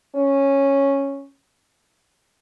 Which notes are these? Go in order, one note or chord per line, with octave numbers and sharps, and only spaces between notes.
C#4